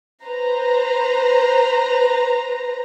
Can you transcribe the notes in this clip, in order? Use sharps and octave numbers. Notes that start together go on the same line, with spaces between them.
B4 C5 A#5